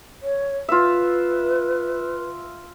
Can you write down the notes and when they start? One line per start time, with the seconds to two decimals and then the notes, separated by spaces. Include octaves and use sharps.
0.22 C#5
0.69 F4 B4 E5